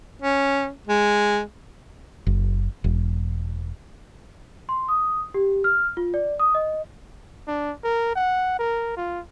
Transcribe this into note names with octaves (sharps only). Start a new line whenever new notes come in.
C#4
G#3
F#1
E1
C6
D#6
G4
F6
F4
D5
D#6
D#5
D4
A#4
F#5
A#4
F4